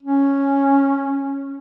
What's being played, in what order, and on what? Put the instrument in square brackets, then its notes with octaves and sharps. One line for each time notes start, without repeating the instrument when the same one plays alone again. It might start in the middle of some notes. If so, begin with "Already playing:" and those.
[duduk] C#4